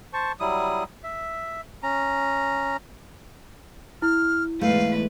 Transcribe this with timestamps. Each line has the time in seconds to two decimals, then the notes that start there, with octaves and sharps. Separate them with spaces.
0.13 C5 A5 C#6
0.40 F#3 G3 E4 D#6
1.04 E5
1.83 C#4 A#5
4.02 E4 F6
4.61 E2 G#2 A3 B4 F5